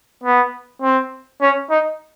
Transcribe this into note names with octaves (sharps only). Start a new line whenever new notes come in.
B3
C4
C#4
D#4